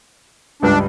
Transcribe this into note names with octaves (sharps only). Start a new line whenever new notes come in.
C#2 G2 D4 B4